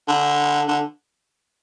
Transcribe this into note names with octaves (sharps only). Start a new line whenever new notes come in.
D3
D3